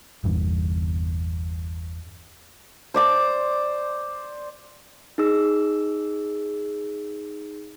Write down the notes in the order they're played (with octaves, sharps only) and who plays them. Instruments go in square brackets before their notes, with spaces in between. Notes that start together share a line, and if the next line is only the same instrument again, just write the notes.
[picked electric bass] G1 E2
[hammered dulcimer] C5 D5 D6
[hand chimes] D#4 G#4 E6